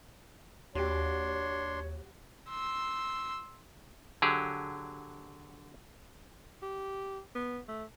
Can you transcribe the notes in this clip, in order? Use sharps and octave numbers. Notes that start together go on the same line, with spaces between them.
D#2 D4 F#4 G4 C#5 C6
C6 E6
D3 F#3 G4 G#4
G4
B3
A3